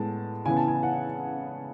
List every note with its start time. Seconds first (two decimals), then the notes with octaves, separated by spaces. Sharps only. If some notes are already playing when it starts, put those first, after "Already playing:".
Already playing: A2 G#3 B3 A5
0.46 C#3 E3 B3 G#5
0.57 A5
0.68 G#5
0.83 F#5